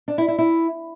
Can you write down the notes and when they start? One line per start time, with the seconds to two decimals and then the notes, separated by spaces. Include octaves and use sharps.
0.08 D4
0.18 E4
0.28 E4
0.39 E4